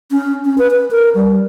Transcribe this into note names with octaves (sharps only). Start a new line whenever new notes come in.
C#4
C#4
B4
B4
A#4
G3